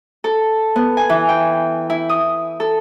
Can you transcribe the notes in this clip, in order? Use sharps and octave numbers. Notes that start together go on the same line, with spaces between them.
A4
B3
G#5
E3
G5
E4
D#6
A4